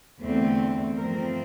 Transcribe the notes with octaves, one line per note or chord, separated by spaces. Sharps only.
E2 D3 A3 C4
G2 F3 A3 C4 A#4